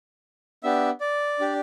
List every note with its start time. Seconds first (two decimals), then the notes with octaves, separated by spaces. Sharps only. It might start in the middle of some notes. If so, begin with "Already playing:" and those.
0.63 B3 D4 G4 E5
1.01 D5
1.39 D4 G4